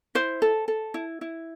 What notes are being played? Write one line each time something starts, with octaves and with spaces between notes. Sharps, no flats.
E4 C5
A4
A4
E4
E4